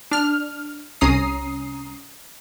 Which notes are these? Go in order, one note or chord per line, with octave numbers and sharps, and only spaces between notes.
D4 F6
C2 C#4 A#5 D#6 C7